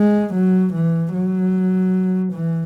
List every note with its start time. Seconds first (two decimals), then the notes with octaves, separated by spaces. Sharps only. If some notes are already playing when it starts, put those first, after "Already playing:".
Already playing: G#3
0.34 F#3
0.74 E3
1.14 F#3
2.34 E3